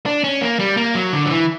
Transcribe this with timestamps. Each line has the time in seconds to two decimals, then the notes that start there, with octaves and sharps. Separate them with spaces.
0.06 D4
0.24 C#4
0.41 A#3
0.59 G3
0.77 A#3
0.95 F#3
1.13 D3
1.25 F#3
1.30 E3